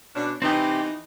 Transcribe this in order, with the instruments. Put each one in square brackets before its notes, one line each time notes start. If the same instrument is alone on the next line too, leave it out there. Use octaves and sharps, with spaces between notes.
[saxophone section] B2 C#4 D4
[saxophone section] E3 D#4 [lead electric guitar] C4 G4